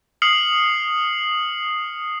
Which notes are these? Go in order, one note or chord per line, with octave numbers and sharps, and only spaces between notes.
D#6 F6 C7 C#7 F#7